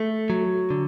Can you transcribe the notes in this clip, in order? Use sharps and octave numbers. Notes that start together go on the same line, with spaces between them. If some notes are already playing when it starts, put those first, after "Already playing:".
Already playing: A3
F#3
D3